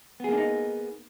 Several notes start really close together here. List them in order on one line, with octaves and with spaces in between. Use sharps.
B3 G#4 A#3 D4 D#4